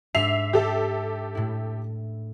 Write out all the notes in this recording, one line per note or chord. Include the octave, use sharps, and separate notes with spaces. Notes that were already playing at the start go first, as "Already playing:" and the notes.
G#2 D4 E5 C7 F7
G4 A4 E5
A2 E4